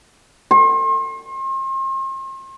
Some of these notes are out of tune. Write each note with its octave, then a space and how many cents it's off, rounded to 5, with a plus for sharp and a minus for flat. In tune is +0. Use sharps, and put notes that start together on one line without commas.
C6 +40